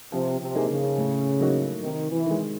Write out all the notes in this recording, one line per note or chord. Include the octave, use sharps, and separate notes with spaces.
C3 F3
C3
A#3 D#4 G#4
C#3
A2
F#3 A#3 D#4 F#4
C3 D#3
E3
D#3 G#3